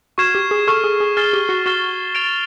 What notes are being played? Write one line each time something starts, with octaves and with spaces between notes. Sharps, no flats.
F#4 C#6 F6 G#6 C7 E7
G4
G#4
A4 C#6 F6 G#6 C7 E7
G#4
G#4
G#4 F6 A6 C7 E7 G7
G4
F#4
F#4 F6 A6 C7 E7 G7
A6 D7 F7